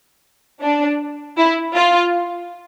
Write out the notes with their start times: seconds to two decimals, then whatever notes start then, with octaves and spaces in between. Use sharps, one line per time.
0.62 D4
1.37 E4
1.75 F4